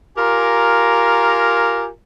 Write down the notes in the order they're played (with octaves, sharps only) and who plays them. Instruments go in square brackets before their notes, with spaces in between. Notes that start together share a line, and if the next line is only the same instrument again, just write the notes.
[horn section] F4 G4 A#4 G#5 A#5